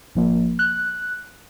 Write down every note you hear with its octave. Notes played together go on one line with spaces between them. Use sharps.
G#1 F3 A#3
F#6